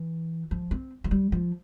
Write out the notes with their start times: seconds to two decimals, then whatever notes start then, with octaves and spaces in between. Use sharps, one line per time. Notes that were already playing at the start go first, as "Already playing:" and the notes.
Already playing: E3
0.51 F3
0.71 C4
1.04 F3
1.11 G3
1.32 F3